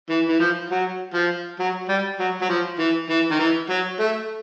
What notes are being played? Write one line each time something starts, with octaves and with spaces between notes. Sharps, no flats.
E3
E3
F3
F#3
F3
F#3
G3
F#3
F#3
F3
E3
E3
D#3
E3
F#3
A3